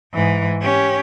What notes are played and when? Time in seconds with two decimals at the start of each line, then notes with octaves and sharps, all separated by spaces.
0.14 G#2 E3
0.61 C#4 G4